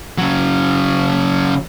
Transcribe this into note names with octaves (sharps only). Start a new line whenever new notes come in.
C#3 F#3